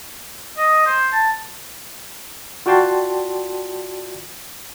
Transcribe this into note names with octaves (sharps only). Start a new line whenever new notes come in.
D#5
C5
A5
F4 F#4 D5 G5 A5 C6